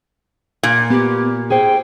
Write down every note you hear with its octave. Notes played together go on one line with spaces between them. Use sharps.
A#2
B3 G4
G#4 C5 G5